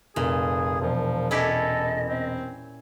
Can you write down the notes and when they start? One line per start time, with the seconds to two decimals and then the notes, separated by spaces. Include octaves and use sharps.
0.16 F1 A#2 G#4
0.82 E1 F3
1.31 C#4 E4 G4 A4 D#5
2.05 C4